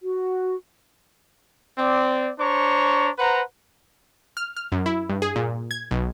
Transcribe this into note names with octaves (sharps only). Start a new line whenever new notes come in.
F#4
C4 D5
D4 C5 C#5 A#5 C#6
B4 C5 F#5 A#5
F6
F6
F#2
E4
G2
G#4
A#2
G#6
B1